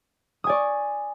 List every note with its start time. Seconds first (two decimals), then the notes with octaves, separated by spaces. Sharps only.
0.44 D#6
0.47 G#5
0.49 D5
0.52 C#6